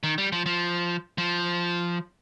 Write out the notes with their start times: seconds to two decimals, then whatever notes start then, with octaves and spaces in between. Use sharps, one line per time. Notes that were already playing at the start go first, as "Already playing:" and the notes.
0.03 D#3
0.18 G3
0.32 F3
0.46 F3
1.18 F3